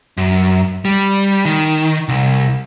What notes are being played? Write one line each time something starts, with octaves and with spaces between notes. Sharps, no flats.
F#2
G3
D#3
C2